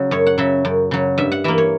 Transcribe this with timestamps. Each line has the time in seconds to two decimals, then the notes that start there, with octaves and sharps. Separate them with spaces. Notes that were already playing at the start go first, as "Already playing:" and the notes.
Already playing: C#3 F#3
0.11 F#2 C#5
0.26 F#5
0.38 C#3 F#3 E5
0.65 F#2
0.91 C#3 F#3
1.18 G2 E5
1.32 F#5
1.44 E3 A#3 E5
1.58 C#5